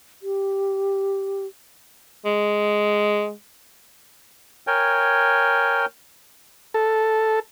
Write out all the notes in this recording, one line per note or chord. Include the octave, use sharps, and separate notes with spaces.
G4
G#3
A#4 C#5 G5 G#5
A4